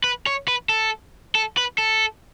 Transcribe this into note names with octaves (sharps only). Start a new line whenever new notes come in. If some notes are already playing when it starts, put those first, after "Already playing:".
B4
C#5
B4
A4
A4
B4
A4